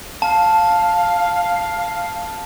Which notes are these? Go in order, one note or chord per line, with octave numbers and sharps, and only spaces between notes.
F5 A5